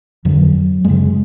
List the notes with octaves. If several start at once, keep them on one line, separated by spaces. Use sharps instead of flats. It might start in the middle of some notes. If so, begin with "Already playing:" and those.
F2 D3 F#3
F#2 C#3 G#3